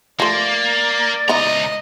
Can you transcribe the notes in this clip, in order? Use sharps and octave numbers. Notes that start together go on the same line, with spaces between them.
F3 A3 A#3 D5
C#2 B3 D#4 E4 D#5 A#5